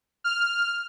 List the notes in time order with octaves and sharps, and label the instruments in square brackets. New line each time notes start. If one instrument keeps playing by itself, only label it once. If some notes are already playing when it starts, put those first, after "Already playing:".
[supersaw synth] F6